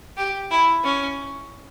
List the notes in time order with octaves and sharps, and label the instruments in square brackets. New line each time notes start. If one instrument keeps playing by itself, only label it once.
[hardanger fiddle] G4
E4
C#4